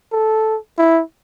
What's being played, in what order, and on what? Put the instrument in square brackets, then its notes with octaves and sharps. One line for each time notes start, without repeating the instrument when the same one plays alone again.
[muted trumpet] A4
E4